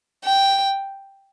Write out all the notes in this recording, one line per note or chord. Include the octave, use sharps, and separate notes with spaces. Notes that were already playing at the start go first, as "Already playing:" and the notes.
G5